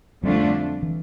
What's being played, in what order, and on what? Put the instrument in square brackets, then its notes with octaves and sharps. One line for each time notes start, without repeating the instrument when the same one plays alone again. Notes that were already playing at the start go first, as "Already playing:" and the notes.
[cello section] F2 D3 A3 D4 F4 [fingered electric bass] G3
[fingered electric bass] E3